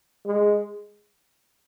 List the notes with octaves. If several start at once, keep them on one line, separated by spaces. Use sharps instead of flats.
G#3